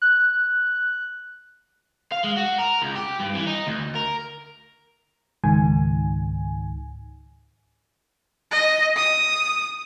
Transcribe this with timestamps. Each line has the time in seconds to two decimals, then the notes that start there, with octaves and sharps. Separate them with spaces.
0.02 F#6
2.12 F5
2.24 G#3
2.37 F#4
2.58 A#4
2.82 C#2
2.95 G4
3.20 G2
3.34 E3
3.47 D#4
3.67 D2
3.95 A#4
5.44 C#2 G#2 D#3 G#5
8.51 D#5
8.96 D#6